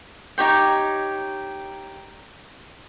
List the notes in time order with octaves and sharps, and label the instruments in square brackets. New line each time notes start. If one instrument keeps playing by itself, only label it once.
[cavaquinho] D#4 G4 C#5 G5